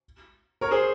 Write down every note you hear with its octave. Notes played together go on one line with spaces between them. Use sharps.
A#4 C#5
G#4 C5